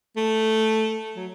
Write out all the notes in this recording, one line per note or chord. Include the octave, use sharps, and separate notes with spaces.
A3
F#3